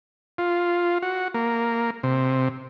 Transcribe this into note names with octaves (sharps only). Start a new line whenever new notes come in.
F4
F#4
A#3
C3